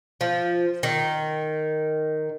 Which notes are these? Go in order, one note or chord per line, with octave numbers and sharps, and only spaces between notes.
F3
D#3